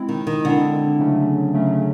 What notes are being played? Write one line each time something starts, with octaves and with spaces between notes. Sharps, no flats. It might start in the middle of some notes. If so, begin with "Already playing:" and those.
Already playing: G#3 C4 E4
D#3
D#3
D3 G#3 C4 E4
C#3 F#3 A3 C#4
C#3 F#3 A3 C#4